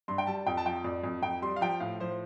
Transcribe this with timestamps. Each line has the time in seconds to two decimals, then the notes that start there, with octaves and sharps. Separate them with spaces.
0.08 G2 C6
0.18 G5
0.27 G3 A5
0.46 F2 G5
0.57 A5
0.65 F3 G5
0.84 F2 D5
1.04 F2
1.23 F2 G5
1.42 G3 C6
1.56 F5
1.61 F3 G5
1.80 A2 F5
2.00 F3 C5